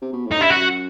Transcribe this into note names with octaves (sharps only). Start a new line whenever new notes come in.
C3
B2
A2
D#4
G2 E4
F#2 F#4